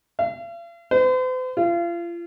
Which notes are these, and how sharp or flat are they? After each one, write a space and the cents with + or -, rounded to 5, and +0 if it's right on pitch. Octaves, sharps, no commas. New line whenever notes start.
F5 -45
C5 -45
F4 -35